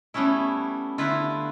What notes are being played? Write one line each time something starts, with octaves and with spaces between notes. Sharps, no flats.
G3 A3 B3 C#4 E4
D3 E4 F4 B4